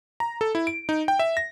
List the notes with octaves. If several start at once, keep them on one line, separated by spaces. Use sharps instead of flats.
A#5
A4
E4
D7
D#4
G5
E5
A#6